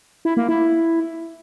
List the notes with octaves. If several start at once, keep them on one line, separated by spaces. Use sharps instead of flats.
E4
A#3
E4